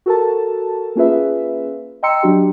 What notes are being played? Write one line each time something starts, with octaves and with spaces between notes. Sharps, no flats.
F#4 A4 A#4 A5
A#3 C#4 F4 G#4 B4 E5
D#5 G5 A#5 C6 E6 C#7
F#3 D4 F#4 G4